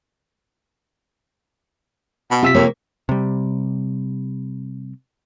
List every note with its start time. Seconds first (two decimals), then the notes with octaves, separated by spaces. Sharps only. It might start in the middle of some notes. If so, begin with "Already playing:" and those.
2.31 B2
2.43 C3 F4 G4 E6 B6
2.55 F2 A#3 A#4 C#5
3.09 C3 G3